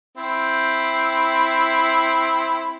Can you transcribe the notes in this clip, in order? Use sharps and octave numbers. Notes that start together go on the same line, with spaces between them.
C4 E4